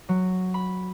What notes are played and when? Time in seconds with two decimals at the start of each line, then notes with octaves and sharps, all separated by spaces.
0.09 F#3
0.54 B5